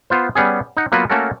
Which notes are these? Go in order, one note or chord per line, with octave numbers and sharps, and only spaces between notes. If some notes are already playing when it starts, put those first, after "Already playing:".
B3 F4 C5
G3 B3 C#4 G#4
D#4 F#5
F#3 A#3 B3 F4 F#4 B4
A3 A#3 C#4 F#4 A4 A#4